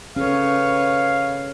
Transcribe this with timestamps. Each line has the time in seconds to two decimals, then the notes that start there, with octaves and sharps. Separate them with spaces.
0.16 C#3 C#4 A4 B4 C#5 F5